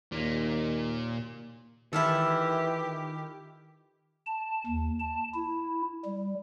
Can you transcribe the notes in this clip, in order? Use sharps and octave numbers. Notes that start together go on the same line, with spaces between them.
D#2 A#2
D#3 E3 E4 F4 G4 A4
A5
D#2
A5
E4
G3